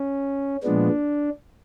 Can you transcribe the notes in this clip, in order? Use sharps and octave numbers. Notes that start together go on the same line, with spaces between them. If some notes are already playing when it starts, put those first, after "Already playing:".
Already playing: C#4
A#2 F3 G#3 B3 D4